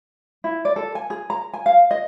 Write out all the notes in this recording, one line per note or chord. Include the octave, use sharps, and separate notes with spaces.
E4
D5
A4
G#5
G#4
A#5
G#5
F5
D#5